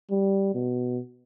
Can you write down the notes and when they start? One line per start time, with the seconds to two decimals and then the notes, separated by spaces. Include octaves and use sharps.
0.11 G3
0.54 B2